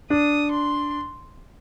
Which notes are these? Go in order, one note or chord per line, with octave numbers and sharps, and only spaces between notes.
D4 D#6
C6